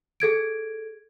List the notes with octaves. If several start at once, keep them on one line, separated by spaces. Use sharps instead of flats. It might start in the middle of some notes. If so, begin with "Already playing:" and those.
G#4 A4 G#6 D7